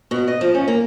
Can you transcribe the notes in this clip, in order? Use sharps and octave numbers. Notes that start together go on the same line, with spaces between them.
B2
D#5
F3
C#4
A#3